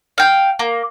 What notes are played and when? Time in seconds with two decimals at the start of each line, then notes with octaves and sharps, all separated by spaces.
0.18 F5 G5
0.59 A#3